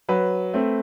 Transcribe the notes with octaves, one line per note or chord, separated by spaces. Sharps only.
F#3 B4
A3 C4